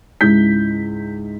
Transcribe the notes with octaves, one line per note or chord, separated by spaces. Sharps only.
C#2 G#2 E4 G6 B6